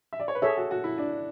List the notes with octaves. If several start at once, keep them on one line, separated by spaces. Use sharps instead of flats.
E5
D5
C#5
B4
G#4 A4 C#5 E5
F#4
F#4
E4
D4